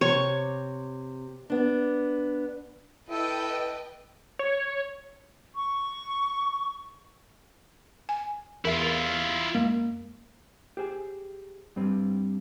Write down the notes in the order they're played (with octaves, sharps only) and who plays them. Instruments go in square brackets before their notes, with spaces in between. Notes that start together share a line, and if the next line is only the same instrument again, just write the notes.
[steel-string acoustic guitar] C3 [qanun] C#5
[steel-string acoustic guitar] B3 D4
[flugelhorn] E4 [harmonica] A4 [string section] B4 D#5 G5
[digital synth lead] C#5
[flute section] C#6
[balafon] G#5
[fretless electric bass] E2 [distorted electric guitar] E4 F4 [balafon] A#4 E5
[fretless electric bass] F#2 A#3 [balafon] G#3
[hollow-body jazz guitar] G4 G#4 C5 G#5
G2 G3 C4 B4